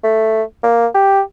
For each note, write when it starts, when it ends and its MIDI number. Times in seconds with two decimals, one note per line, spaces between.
0.04 0.42 57
0.63 0.86 58
0.94 1.21 67